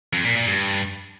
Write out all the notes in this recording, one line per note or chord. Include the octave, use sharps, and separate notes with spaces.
F2
A#2
A#2
G2